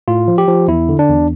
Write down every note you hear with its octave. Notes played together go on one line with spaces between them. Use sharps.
A2 F4
F3
G4
F3
E2 E4
D3
D4
E2